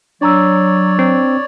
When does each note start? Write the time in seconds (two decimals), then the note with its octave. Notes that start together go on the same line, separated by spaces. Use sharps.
0.21 F#3 D4 C#5 D5 A#5 E6
0.99 C4